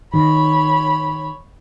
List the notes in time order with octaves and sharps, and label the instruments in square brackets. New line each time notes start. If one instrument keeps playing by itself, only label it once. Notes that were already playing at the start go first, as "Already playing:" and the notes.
[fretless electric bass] D#3 [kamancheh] C#5 B5